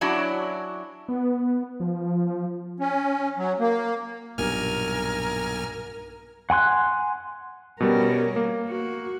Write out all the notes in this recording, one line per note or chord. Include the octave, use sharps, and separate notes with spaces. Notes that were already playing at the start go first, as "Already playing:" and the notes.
F#3 C#4 D4 E4 F#4 C#5
B3
F3
C#4
F#3
A#3
B1 G2 A#2 A#4 G#5 F6
F#5 G#5 C6 F#6
B2 G3 C#4 A#4
A#3
F#4